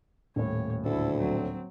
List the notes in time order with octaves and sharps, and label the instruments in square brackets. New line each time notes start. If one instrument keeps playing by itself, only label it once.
[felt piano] D#1 A2 [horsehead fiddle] C#5
[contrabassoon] D2 [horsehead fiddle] E4 A4
[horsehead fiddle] F#3 C4